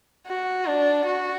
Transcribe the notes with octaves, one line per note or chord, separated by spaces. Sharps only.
F#4
D4
F#4